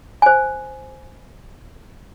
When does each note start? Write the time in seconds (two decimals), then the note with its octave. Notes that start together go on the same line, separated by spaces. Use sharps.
0.22 C5 G#5